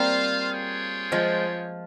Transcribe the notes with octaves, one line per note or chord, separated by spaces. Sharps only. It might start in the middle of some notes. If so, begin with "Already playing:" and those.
Already playing: G3 A#3 C4 F4 C5 F5
F4 G#4 C#5 G5
F3 G#3